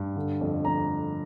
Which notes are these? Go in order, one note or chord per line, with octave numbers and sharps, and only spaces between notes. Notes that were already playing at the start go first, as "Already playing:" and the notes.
Already playing: G2
D3
F2
F2 A#5